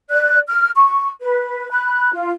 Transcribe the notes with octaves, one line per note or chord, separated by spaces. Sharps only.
D5 F#6
F6
C#6
B4
B5 F#6
F4